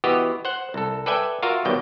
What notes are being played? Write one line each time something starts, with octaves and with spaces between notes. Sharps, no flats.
E3 B3 F#4 G4 D#5
C5 F#5
C2 A4
A4 B4 D5 E5 G5 G#5
F4 F#4 A#4 E5 F5
B2 D#3 F#3 G3 G5